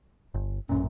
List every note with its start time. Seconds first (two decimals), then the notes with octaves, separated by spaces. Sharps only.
0.34 G1
0.69 A1 F#2 A#2 C#4